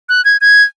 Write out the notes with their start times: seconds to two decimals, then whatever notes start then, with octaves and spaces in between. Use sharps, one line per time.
0.09 F#6
0.25 G#6
0.41 G#6